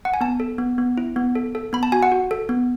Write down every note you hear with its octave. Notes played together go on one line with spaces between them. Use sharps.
F#5
G#5
B3 A5
A4
B3
B3
E4
B3
A4
A4
B3 B5
A5
F#4 G#5
F#5
F#4
A4
B3